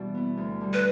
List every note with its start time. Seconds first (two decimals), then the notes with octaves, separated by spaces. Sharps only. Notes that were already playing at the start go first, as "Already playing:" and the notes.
Already playing: B2 E3 G3 D4
0.14 B3 E4
0.37 D2
0.61 D3 G3
0.73 B4